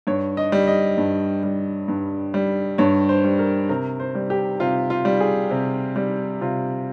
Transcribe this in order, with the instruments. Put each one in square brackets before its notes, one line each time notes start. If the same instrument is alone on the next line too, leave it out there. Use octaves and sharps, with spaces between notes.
[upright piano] G2 C#5
D#5
G3
D#5
G2
G3
G2
G3
G2 C#5
C5
G3
A#4
C3 A#4
C5
G3
G4
C3 F4
F4
G3
G#4
C3
G3
C3 F4